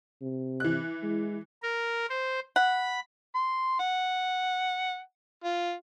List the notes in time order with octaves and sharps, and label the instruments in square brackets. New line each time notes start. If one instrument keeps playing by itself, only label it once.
[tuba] C3
[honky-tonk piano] E3 F#6
[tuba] G#3
[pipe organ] A#4
C5
[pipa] F#5 [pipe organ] B5
[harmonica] C6
F#5
F4